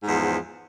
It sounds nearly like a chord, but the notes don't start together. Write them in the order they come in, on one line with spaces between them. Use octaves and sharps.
G#2 E2 F3